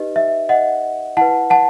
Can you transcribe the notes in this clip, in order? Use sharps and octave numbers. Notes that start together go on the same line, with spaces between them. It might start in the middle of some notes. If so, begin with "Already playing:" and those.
Already playing: D#4 G4 B4 D#5
E5
D#5 F#5
E4 B4 F#5 A5
F#5 A5